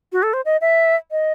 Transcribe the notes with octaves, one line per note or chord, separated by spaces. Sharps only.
F#4
A4
C5
D#5
E5
D#5